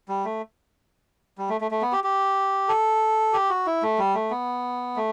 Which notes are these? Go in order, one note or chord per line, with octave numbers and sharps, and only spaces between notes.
G3
A3
G3
A3
A3
A3
B3
G4
G4
A4
G4
F#4
E4
A3
G3
A3
B3
A3